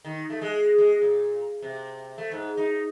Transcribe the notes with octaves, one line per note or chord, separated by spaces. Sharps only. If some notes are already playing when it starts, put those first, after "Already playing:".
D#3
A3
G#3
G#3
A#2
C3
A3
G#2
D#4